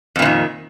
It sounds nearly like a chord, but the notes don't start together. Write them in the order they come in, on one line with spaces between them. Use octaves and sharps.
F2 A#2 E3 D#3